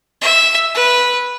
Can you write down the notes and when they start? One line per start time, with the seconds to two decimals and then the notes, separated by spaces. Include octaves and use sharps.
0.21 E5
0.74 B4